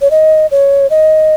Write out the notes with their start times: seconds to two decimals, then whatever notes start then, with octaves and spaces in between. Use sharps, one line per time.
0.01 C#5
0.11 D#5
0.51 C#5
0.90 D#5